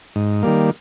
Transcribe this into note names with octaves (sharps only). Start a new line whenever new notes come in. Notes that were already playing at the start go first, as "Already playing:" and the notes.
G#2
D#3 G3 A#3